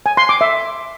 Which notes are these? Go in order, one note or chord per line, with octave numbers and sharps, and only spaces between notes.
G#5
C6
D6
E5